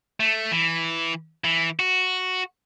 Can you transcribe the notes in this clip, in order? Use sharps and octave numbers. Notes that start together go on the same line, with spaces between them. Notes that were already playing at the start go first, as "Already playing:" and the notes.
A3
E3
E3
F#4